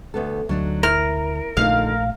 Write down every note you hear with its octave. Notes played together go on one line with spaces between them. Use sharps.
D2 B3 A4
D2 F#3 D4 D#4
E4 A#4 F6
A#1 A#2 D3 A3 D#4 F4 F5